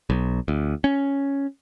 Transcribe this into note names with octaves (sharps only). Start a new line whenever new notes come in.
B1
D2
C#4